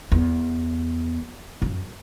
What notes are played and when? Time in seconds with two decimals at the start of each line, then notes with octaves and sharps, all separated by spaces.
0.12 E2
1.62 F#2